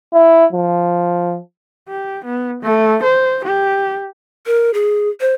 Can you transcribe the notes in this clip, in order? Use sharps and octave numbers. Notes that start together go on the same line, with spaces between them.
E4
F3
G4
B3
A3
C5
G4
A#4
G#4
C5